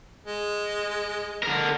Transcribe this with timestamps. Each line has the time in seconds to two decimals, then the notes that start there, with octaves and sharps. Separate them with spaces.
0.24 G#3
1.43 D3 A#4